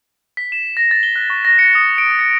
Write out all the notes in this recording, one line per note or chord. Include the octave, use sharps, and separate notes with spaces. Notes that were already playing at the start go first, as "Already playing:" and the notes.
B6
E7
A#6
A6
G7
F#6
C#6
A#6
C#7
D#6
D7
C#7